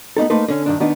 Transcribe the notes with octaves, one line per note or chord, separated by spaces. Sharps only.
B3 D4 D#4 A4
A3 A#3 D#4 B4 C5
D3 C#4
G2 D#3 D4
D#3 B3 D4 D#4